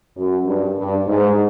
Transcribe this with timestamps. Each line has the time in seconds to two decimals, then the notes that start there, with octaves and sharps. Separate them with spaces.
0.17 F#2
0.46 G2
0.77 G2
1.07 G#2